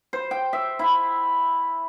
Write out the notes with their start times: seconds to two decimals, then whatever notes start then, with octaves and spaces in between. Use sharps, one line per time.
0.13 C5
0.31 G5
0.53 E5
0.79 E4